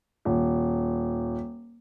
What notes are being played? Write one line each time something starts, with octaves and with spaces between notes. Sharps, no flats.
D#1